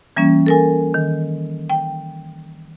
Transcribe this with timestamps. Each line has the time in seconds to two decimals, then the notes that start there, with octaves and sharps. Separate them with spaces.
0.16 E3 G3 A#3 C#4
0.46 A4 A#4 G#5
0.94 D#3
1.70 G5